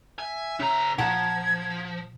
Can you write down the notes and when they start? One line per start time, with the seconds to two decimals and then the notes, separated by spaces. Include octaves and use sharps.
0.19 E5 G#5
0.60 C#3 C#4 A#5
0.98 A#2 F3 F#5 A5 A#5 G#6